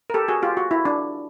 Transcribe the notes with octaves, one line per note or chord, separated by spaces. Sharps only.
A#4
G4 A4
F#4 G#4
F4 G4
F#4
E4
D4